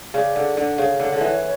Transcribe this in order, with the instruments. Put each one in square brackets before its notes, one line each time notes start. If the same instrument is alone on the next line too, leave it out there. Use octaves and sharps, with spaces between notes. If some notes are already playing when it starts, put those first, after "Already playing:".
[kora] C#3 [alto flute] D5
[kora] D3
D3
[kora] C#3 [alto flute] C#5
[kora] D3
D3
E3